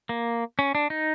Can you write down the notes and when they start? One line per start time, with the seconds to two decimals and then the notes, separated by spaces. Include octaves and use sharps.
0.09 A#3
0.59 C#4
0.75 D4
0.90 D#4